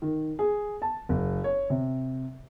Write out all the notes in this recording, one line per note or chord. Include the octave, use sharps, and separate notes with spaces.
D#3
G#4
A5
F#1
C#5
C3